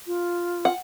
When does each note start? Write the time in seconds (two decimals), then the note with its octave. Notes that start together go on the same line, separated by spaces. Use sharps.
0.07 F4
0.65 F#5